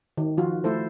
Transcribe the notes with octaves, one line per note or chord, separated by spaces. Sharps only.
D#3
F3 F4 F#4
A3 E4 A4 C5